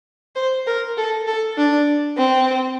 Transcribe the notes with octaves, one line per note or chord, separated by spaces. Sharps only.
C5
A#4
A4
A4
D4
C4